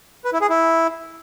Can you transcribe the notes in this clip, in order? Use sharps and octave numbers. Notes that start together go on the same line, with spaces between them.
B4
E4
G#4
E4